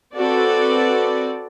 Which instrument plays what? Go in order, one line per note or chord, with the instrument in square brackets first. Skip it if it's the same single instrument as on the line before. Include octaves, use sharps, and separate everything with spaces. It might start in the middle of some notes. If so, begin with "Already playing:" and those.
[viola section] C4 F#4 A4 B4 D5